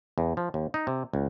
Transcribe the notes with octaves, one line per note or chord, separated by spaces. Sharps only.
E2
F3
D#2
D#4
C3
C#2